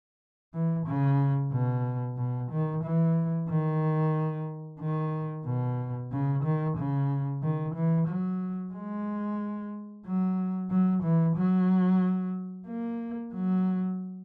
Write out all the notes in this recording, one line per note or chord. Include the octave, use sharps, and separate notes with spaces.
E3
C#3
B2
B2
D#3
E3
D#3
D#3
B2
C#3
D#3
C#3
D#3
E3
F#3
G#3
F#3
F#3
E3
F#3
A#3
F#3